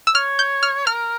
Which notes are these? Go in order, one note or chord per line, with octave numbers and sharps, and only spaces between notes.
E6
C#5 F6
G6
F6
A#4 F6